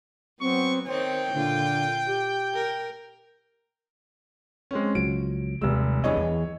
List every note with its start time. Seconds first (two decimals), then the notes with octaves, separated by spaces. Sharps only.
0.41 F#3 B3 C4 C#6
0.87 D#3 C4 C5 C#5 G5
1.34 A#2 D3 F4
2.07 G4
2.54 A#4
4.71 G#3 C4 C#4
4.95 C#2 F3 F#3 D7
5.61 F1 D#2 G3 G#3 E6
6.04 E2 E3 G3 D4 G#4 C#5 D#5
6.17 E2